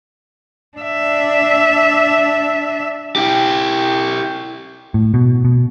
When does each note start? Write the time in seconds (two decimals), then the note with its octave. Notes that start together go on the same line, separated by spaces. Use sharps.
0.77 D4 E5
3.16 E4 G4
4.94 A2
5.14 B2
5.45 B2